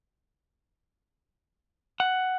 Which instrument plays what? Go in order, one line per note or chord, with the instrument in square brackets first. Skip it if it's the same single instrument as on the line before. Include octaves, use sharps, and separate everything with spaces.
[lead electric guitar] F#5